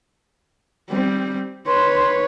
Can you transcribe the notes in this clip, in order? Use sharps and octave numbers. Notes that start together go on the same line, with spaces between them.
G3 C4
B4 C#5 C6